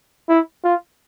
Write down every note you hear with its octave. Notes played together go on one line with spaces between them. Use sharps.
E4
F4